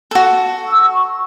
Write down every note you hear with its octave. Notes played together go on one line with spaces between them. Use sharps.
F#4 A4
E6
C#6